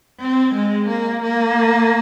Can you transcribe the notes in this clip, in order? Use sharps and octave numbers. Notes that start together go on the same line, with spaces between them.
C4
G#3
A#3
A#3